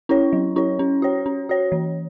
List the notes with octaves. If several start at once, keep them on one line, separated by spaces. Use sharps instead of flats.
C#4 E4 C#5
F#3
C#4 E4 C#5
C#4
F#4 C#5
C#4
F#4 C#5
E3